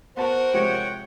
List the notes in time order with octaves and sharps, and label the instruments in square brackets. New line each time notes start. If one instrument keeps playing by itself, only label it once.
[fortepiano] B3 A5 [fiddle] F#4 A#4 [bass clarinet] C5
[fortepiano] C3 F3 G#3 [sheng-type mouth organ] C#5 F#5 G5